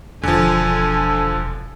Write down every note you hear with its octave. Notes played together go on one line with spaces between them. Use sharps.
E1 D3 F3 A4 G#5